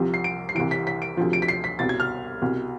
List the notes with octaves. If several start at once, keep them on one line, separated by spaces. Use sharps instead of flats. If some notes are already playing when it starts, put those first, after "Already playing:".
Already playing: C2 C3 F3
C7
D7
C7
C2 C3 E3 D7
B6
B6
D7
D2 C3 F3
D7
B6
C7
B6
C2 B2 A6
G#6
F6
C2 B2